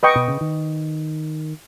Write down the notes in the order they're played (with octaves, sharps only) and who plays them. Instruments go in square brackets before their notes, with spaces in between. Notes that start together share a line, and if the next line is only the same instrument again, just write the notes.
[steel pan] B4 D#5 G5 C#6
[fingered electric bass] B2
C#3
D#3